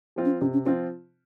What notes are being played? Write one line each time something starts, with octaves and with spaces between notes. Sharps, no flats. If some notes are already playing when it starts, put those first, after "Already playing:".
F3 C4 F4
C#4
C3 C#4
C#4
F3 C4 C#4 F4